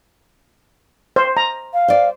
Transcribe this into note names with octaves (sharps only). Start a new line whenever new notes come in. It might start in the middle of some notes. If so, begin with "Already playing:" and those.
C5
A#5
F5
C5 D5